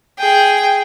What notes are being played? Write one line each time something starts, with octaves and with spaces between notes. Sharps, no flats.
G#4 G5